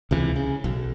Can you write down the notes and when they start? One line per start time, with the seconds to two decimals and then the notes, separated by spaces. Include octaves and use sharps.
0.11 C#2 C3 E3
0.36 C#3
0.64 B1